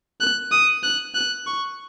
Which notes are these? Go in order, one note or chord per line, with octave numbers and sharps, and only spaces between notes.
F#6
D#6
F#6
F#6
C#6